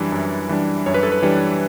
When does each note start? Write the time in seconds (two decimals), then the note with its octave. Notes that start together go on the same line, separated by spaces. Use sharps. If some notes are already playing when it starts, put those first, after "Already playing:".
Already playing: F#2 E3 G3 D4
0.12 F#2
0.49 E3 G3 D4
0.86 F#2 C#5
0.94 B4
1.03 A4
1.12 B4
1.22 E3 G3 D4